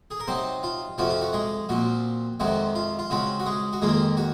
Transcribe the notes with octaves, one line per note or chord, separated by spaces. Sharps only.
G#4
A#4
C3 F#3 C4 D#4 C5
F4
F2 C3 F3 C4 F4 F#4
F4
F#4
G#3 G#4
A#2 F3 C4 F#4
F2 C3 D#3 G#3 C4 F#4
F4
F4
C#3 G#3 C4 F4 F#4
F#4
G#3 G#4
F#4
F2 D#3 G#3 A#3 F4 G#4
F#4